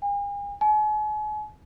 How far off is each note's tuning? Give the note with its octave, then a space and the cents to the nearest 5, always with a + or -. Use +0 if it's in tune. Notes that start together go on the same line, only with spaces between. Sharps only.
G#5 -45
G#5 +40